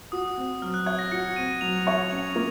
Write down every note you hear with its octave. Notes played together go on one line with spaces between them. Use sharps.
F#4 D#6
C4
F#3 F6
F#6
C#5 G#6
A#6
F#4 C#7
C4 D#7
F#3 F7
C#5
C#4 F7
A#3